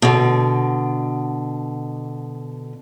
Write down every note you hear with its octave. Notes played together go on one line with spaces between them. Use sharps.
B2 D3